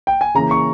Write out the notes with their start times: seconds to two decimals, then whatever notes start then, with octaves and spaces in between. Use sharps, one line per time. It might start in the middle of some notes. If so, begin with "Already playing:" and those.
0.07 G5
0.21 G#5
0.35 C#3 E3 A#3 C#4 A#5
0.51 C#6